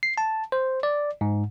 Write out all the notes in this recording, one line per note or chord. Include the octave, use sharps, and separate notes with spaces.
C7
A5
C5
D5
G#2